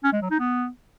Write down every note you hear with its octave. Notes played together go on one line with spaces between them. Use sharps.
C#4
G#3
F#3
D#4
B3